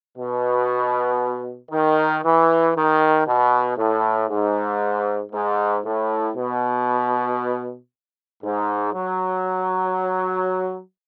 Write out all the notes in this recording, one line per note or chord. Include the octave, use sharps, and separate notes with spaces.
B2
D#3
E3
D#3
B2
A2
G#2
G#2
A2
B2
G#2
F#3